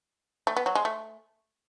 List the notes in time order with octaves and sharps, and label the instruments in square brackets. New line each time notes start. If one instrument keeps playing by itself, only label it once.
[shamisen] A3
B3
F#3
G#3
A3